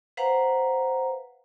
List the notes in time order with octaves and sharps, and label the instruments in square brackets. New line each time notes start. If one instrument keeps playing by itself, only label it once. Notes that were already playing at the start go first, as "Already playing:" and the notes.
[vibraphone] B4 C5 F5 F#5 A#5